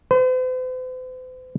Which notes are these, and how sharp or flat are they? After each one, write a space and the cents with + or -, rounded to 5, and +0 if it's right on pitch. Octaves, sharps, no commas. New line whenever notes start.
C5 -45